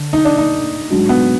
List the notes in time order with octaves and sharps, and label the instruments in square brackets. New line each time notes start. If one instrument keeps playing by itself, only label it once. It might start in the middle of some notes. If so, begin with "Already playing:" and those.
Already playing: [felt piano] D3
[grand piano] D#4
D4
D#4
[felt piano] G#2 F#3 D4 F#4
[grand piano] B3